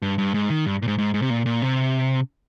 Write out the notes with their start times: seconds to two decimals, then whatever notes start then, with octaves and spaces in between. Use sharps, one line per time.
0.02 G2
0.18 G2
0.34 G#2
0.50 D#3
0.66 G2
0.82 A#2
0.88 G#2
0.98 G#2
1.14 G#2
1.22 C3
1.30 A#2
1.46 A#2
1.62 C3